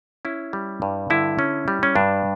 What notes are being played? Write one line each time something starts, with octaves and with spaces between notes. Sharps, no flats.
C#4 E4
G3
G2
D3 E4
C#4
G3
C#4
G2 D4